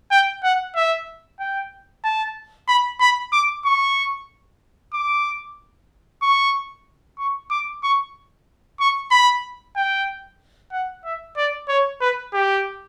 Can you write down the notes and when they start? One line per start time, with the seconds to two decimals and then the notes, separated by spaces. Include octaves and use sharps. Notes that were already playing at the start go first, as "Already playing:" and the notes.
0.11 G5
0.44 F#5
0.76 E5
1.40 G5
2.04 A5
2.68 B5
3.00 B5
3.32 D6
3.66 C#6
4.94 D6
6.22 C#6
7.19 C#6
7.51 D6
7.83 C#6
8.80 C#6
9.11 B5
9.76 G5
10.72 F#5
11.05 E5
11.37 D5
11.69 C#5
12.01 B4
12.34 G4